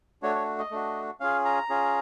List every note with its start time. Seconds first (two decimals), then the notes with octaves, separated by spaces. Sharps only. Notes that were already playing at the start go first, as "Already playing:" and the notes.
0.22 A3 D4 F#4 C#5
0.35 C#5
0.59 D#5
0.71 A3 D4 F#4
1.20 C#4 F4 G#4 F5
1.45 A#5
1.69 C#4 F4 G#4